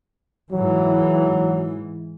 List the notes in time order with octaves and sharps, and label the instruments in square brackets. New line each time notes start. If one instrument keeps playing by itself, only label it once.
[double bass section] G#2 E3 [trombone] F#3